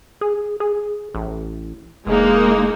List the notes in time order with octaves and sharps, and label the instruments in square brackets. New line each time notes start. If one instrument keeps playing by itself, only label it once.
[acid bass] G#4
G#4
A1
[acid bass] E1 [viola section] G#3 A#3 D#4